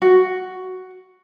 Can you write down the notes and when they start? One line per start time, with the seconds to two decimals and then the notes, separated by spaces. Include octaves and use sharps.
0.02 F#4